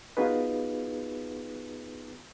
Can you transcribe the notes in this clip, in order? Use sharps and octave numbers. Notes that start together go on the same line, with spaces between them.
B3 D#4 F4 F#4 G#4 B4